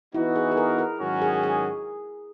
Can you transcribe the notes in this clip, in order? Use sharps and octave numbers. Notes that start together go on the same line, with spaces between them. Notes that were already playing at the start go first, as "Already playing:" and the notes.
E3 B3 D#4 E4 F#4
G#4
G#4
A#4
A#4
G#2 D#3 F#3 C#4 F#4
G#4
G#4